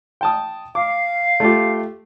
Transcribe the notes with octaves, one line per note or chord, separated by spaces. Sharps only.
G5 A5 D#6
F5 D6
A3 F4 G4